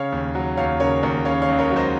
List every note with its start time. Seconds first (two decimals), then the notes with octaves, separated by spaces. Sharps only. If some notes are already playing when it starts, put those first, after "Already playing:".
Already playing: C#3 C#5 F5
0.12 D#2
0.35 F#3
0.57 D#2 C#5 F5
0.80 C#3 A#4 C#5
1.03 D#2 A#4 C#5
1.25 C#3 C#5 F5
1.42 C#5 F5
1.48 C#2
1.59 A#4 C#5
1.71 F#3
1.76 C5 D#5